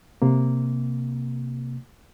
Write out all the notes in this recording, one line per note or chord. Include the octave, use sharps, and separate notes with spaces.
C3 A#3